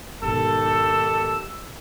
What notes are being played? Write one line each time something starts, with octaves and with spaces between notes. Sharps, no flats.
G#2 B2 D#3 G4 A4 E6